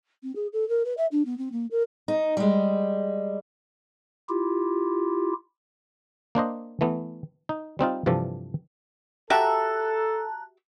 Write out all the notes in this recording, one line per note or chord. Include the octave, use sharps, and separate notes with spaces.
C4
G#4
A4
A#4
B4
E5
D4
B3
C4
A#3
A#4
D#4
G3 G#3
E4 F4 G4
A#3 D4 C5 D#5
E3 A3 B3
D#4
G3 C4 D#4 F4
G2 C3 E3 F3 A4 D5
F#4 G4 A4 E5 A5 A#5 F#6